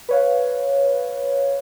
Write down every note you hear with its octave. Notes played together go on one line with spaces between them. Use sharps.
B4 C#5 F5